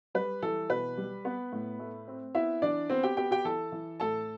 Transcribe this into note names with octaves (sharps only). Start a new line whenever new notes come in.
G3 B4
E3 A4
B2 B4
G3
B3
A2
A3
C4
B3 E4 E5
E3 D4 D5
B3 C4 C5
G4 G5
B3 G4 G5
G4 G5
E3 A4 A5
E3
A2 A4 A5